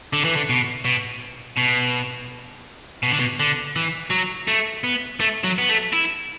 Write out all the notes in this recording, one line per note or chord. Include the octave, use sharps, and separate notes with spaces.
D3
E3
D3
B2
B2
B2
B2
D3
B2
D3
E3
F#3
A3
B3
A3
F#3
B3
A3
E4